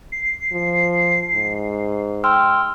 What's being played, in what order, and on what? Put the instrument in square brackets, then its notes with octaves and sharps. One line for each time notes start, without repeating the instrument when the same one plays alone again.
[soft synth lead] C7
[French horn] F3
G#2
[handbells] G5 E6 F6 [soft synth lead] C6